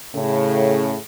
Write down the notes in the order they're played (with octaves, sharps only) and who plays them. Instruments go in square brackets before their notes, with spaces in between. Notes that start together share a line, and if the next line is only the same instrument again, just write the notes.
[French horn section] A2 C#3